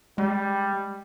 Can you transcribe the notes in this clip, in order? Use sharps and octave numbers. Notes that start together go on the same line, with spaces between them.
G3 G#3